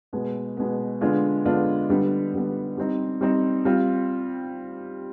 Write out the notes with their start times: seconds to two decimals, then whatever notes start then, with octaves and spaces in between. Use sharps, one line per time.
0.13 B2 G#3 B3
0.57 B2 G#3 B3
1.01 D3 G#3 B3 D4 F4
1.45 D3 G#3 B3 D4 F4
1.90 D3 G3 B3
2.34 D3 G3 B3
2.77 G3 C4 D#4
3.21 G3 C4 D#4
3.65 G3 C4 F4